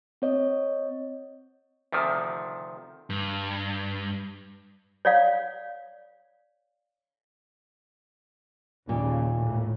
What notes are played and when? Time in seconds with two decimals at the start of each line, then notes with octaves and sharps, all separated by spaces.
0.22 C4 C#5 D#5
1.92 D2 C3 D#3 F3
3.10 G2
5.05 C#5 D5 F5
8.89 D#2 A#2 C#3
9.38 A2